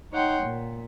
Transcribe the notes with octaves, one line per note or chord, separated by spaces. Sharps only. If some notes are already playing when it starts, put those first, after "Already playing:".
D#4 C#5 F#5 G5 C6
A#2